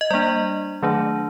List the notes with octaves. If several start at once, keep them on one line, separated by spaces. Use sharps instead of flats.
D#5
G3 A#3 D4 D5
D#3 F#3 A3 D4